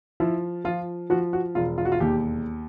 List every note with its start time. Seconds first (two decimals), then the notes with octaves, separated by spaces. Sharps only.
0.20 F3 E4
0.65 F3 F4
1.10 F3 F#4
1.33 F#4
1.55 E1 F4
1.78 F4
1.85 F#4
1.92 F4
2.00 D#2 G4